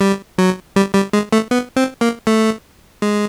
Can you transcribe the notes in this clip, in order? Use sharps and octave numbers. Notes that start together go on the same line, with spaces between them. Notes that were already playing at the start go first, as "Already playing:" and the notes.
G3
F#3
G3
G3
G#3
A3
B3
C4
A#3
A3
G#3